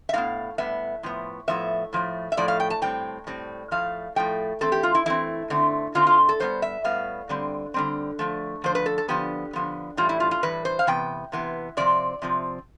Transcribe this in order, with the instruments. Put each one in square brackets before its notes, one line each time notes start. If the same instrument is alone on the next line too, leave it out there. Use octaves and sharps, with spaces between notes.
[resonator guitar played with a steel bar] E5
A2 G3 B3 F5
A2 G3 B3 E5
A2 F3 B3
A2 F3 B3 E5
A2 F3 A3
E5
A2 F3 A3 D5
F5
G5
A5
A2 G3 C4 G5
A2 G3 C4
A2 F3 A3 F5
A2 F3 A3 G5
E3 A3 C4 A4
G4
F4
E4
E3 A3 C4 E4
D3 A3 C4
D3 A3 C4 F4
F4
A4
A2 G3 B3 C5
E5
A2 G3 B3 F5
D3 G3 C4
D3 G3 C4
D3 F3 A3
D3 F3 A3 C5
B4
A4
A4
D3 F3 B3 G4
D3 F3 B3
A2 E3 G3 F4
E4
F4
F4
A2 E3 G3 B4
C5
F5
C3 E3 B3 G5
C3 E3 B3
C3 F3 C4 D5
C3 F3 C4